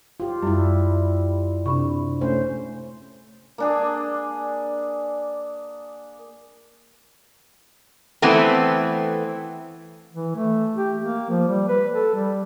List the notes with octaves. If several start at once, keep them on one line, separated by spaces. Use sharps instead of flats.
F4 G4
F#2 G3 E4
C3 D4 B5 C#6
A3 C#4 C5
A#3 D4 G#4
E3 A3 B3 C4
E3
A3
G4
A#3
F3
G3
B4
A4
G3